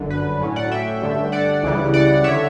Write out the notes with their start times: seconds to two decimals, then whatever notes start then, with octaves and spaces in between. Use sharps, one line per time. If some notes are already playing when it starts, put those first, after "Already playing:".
Already playing: G1 F#2 D3
0.10 B4
0.41 A2 F#3 C#4
0.56 D5 F#5
0.72 E5 G5
1.02 G2 D3 A3 D4
1.32 D5 F#5
1.63 C#2 C#3 E3 G3
1.94 D5 F#5
2.24 D3 C#5 E5